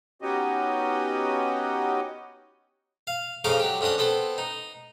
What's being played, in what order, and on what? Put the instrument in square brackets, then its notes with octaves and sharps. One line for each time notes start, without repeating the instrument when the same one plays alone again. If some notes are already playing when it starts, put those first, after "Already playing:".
[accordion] B3 C#4 D#4 F#4 G4 D#5
[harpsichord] F5
F2 C#3 D#4 F5 C#6 D6
F#3 G4
F2 C#4 D4 F#4 D#6
B3 C4 A4
D#4